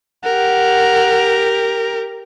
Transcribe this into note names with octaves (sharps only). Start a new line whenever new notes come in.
G4 A#4 F#5